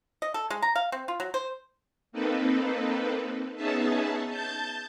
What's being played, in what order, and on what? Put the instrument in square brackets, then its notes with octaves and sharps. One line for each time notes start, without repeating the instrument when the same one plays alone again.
[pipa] D#5
A4
G#3
A#5
F5
C4
F4
F#3
C5
[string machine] A#3 C4 D#4 A4 B4
B3 C#4 D#4 G#4 E5 A5
A5 G6 A6